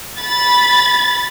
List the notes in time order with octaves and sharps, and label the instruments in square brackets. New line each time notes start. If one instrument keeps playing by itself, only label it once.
[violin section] B5 A6